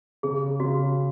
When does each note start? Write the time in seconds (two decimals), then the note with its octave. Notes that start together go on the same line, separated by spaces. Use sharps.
0.23 C#3 G#4
0.60 C#3 F#4